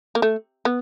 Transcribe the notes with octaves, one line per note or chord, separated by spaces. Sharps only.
A#3
A3
B3